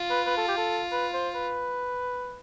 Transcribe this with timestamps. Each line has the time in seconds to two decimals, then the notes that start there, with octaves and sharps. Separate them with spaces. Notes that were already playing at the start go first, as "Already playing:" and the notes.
Already playing: F4
0.10 B4
0.27 B4
0.37 A4
0.48 G4
0.57 A4
0.92 B4
1.14 C5
1.35 B4